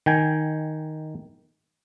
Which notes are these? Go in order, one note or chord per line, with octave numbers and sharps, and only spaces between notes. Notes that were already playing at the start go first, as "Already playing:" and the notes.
D#3 G5 G#5